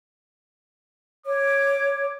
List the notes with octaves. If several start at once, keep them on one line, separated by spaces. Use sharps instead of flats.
C#5 D6